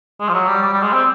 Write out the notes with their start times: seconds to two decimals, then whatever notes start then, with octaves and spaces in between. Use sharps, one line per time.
0.20 G#3
0.29 F3
0.34 F#3
0.48 G3
0.62 G3
0.73 G3
0.83 G#3
0.93 C4